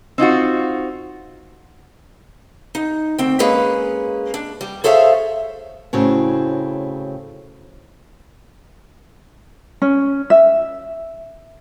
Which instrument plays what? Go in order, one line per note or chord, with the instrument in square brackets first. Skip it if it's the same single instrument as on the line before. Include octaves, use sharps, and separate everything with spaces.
[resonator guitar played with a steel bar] C4 D#4 F4 F#4
[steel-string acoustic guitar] D#4
D2 C4 G5
G#3 A#3 C#4 G#4 B4
D4
G3
G#4 A4 C5 C#5 E5 F5
[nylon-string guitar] A2 C#3 C4 F#4
[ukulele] C#4
E5